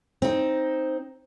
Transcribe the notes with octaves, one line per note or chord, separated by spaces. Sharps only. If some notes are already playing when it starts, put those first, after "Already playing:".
C4 D#4